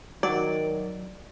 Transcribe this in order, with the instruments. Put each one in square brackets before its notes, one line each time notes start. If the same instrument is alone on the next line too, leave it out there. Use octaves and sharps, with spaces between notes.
[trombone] D#3 [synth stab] F#3 [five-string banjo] D5